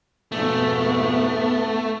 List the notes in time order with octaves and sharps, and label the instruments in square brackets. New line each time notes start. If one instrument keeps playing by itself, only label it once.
[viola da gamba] F2 G#2 B2 [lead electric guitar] A3 [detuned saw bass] B3